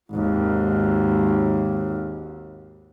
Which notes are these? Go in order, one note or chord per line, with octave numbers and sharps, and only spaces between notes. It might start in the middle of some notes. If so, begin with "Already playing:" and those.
G#1 D#2